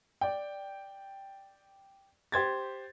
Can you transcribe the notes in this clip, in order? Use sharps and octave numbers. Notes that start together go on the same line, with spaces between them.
D5 G5
G4 C5 G#6 A6